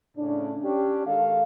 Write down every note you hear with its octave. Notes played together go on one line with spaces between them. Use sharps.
A2 C#3 C#4 D4
C#4 D4 G4
D#3 G#3 A4 F5